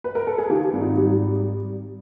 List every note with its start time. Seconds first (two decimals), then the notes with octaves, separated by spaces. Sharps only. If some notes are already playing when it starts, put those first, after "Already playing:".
0.04 B4
0.15 A#4
0.27 A4
0.38 G#4
0.50 D#3 F4 G4
0.73 G#1
0.81 D#4 F4
0.97 G3